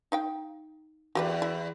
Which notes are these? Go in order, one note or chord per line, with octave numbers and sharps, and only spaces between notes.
D#4 F5 G5
E2 F#4 G4 B4
E4